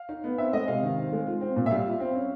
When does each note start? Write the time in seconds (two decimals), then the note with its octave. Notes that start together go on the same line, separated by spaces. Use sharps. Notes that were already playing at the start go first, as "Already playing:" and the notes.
Already playing: F5
0.09 D#4
0.24 B3
0.38 C4 E5
0.53 G#3 D#5
0.68 C3 F5
0.83 D#3
0.98 C4
1.12 G#3
1.27 F4
1.41 C4
1.56 A#2
1.66 E5
1.71 G3 F5
1.86 F4
2.00 C4
2.15 C#4